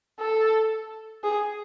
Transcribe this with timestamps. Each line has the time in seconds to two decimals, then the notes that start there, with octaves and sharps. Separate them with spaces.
0.20 A4
1.23 G#4